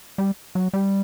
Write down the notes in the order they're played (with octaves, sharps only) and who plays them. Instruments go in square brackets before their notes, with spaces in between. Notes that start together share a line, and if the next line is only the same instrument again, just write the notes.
[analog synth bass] G3
F#3
G3